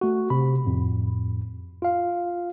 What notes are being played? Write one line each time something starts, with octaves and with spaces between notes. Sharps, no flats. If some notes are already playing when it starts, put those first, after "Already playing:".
A3 F#4
C3 B5
F2 A2
F4 F5